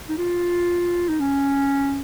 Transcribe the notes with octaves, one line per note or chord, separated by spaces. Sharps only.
D#4
F4
D#4
C#4